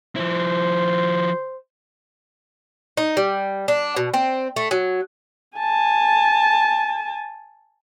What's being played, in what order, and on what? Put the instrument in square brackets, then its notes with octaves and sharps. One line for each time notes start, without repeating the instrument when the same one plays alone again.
[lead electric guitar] F3 E4 [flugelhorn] C5
[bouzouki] D#4
G3
D4
B2
C4
A3
F#3
[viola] G#5 A5